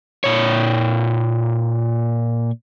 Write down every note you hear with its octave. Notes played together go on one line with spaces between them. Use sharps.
A#2 C#5